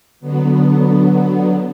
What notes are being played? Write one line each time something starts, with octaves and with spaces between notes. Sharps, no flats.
D3 F#3 B3